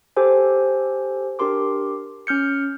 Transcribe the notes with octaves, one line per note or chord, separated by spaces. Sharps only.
G4 A4 C5 G#5
D4 G4 A#4 C6 D6
C#4 F6 G6 C#7